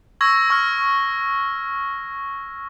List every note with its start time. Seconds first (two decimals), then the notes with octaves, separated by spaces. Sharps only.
0.21 C#6 E6 G#6 A#6
0.50 C#6 F6